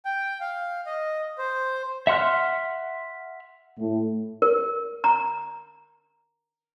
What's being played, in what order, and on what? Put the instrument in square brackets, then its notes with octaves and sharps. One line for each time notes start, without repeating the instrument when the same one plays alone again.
[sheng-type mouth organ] G5
F5
D#5
C5
[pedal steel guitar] E5 F#5 C6 F6 F#6
[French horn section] A2
[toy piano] A#4
A#5